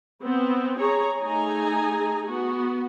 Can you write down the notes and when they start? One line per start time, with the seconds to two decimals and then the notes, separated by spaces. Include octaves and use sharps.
0.22 B3 C4
0.78 G#4 C#5 A#5
1.21 A3 D#4 G#4 G#5 A#5
2.26 B3 F#4